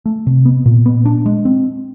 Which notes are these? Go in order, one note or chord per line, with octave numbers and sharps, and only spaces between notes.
A3
C3
B3
A#2
B3
D4
G#3
C4